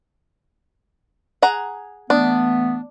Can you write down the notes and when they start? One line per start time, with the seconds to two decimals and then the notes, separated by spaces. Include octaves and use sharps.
1.42 G#4 F#5 A#5
2.10 E3 A3 B3 D4